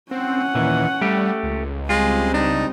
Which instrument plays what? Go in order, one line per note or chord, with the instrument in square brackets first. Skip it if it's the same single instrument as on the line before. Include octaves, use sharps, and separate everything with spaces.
[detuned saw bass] C4 [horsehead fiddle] C#4 F#5
[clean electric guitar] D#2 E3 [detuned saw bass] A#2
[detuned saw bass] G3 [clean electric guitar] A3 G4
[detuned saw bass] C#2
[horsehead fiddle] G3 C4 [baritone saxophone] G#3 [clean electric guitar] F4
[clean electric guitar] D4 [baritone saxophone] D#4